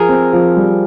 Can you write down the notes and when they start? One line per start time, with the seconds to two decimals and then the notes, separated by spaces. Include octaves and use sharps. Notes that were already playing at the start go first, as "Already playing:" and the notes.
Already playing: F3 G#4 A#4
0.09 C4
0.33 F3
0.57 G3